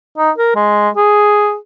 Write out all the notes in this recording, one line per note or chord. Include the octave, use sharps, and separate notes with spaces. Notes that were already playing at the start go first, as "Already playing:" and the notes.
D#4
A#4
G#3
G#4